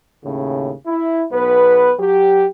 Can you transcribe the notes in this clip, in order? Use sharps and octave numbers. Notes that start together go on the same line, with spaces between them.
D#2 A2 C#3
E4
B1 B3 B4
F#3 G4